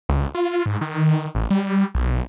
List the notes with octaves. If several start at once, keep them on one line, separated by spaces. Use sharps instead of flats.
C#2
F4
G#2
D#3
A1
G3
B1